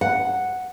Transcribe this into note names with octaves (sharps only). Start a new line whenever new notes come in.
F#5